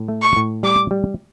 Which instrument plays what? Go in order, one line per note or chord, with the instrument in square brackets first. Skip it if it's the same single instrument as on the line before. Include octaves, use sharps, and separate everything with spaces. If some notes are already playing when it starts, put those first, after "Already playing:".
Already playing: [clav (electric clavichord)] A2
A3
[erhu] C#6
[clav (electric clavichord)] A2
[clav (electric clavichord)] G3 [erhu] D6
[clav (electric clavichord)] G3